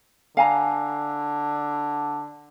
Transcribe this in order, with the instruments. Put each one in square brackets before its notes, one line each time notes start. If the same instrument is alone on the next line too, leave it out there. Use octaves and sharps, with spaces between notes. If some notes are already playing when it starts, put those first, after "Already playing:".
[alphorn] D3 [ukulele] F5 G#5 A#5